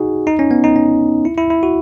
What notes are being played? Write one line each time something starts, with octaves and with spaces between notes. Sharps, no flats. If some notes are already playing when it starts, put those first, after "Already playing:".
Already playing: D#4 F#4 G#4
D#4
C#4
B3
D#4
C#4
E4
E4
E4
F#4